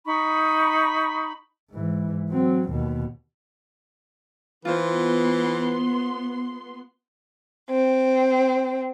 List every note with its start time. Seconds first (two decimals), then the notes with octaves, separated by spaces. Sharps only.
0.06 D#4 B5 C#6
1.71 G#2 E3
2.30 F#3 C4
2.70 D#2 B2
4.65 E3 B3 F4 C5 C6
7.70 C4